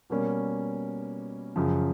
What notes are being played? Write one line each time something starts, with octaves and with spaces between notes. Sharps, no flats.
B2 G3 A#3 C#4
F#2 C#3 F3